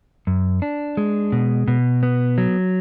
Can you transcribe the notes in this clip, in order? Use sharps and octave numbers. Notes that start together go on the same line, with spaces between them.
F#2
D4
G#3
B2
B2
B3
F#3